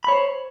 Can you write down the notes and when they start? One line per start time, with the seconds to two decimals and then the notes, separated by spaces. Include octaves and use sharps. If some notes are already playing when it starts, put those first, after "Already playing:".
0.04 B5
0.08 C#5
0.12 C5